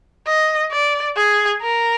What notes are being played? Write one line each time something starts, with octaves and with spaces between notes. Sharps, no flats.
D#5
D5
G#4
A#4